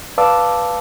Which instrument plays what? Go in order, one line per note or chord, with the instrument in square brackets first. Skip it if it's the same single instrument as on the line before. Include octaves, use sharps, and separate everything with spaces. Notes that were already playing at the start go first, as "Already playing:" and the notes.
[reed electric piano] B4 D5 F5 A5 D6 E6